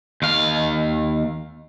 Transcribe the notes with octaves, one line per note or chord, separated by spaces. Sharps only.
D#2 F5